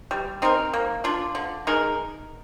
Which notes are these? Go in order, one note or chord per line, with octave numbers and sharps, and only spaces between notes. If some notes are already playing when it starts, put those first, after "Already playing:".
G3
C4 D#4 A#4
A#3
D4 F4
D3
G#3 D#4 A#4